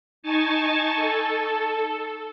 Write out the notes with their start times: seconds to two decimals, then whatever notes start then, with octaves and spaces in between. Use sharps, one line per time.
0.22 D#4 G#5 A5 C#6 A6
0.96 A4